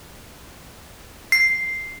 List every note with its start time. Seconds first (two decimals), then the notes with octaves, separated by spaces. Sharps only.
1.32 C7